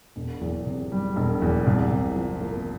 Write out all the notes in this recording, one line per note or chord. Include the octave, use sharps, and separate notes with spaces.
E1
E2
C3
G3
E1
E2
C2
C3
F3
A#3